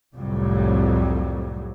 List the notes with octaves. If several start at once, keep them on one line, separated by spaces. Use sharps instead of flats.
C2 F2 A2 C3 F#3 G3